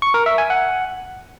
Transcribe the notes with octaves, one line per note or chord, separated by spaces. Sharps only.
C#6
A#4
E5
G#5
F#5